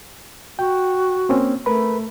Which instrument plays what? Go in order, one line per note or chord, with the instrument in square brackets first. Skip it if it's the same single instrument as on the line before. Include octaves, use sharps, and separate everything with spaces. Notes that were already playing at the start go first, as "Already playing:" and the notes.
[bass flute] F#4 [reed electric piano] G5
[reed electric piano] A#3 C4 C#4
[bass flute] A3 [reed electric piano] A#4 B4 B5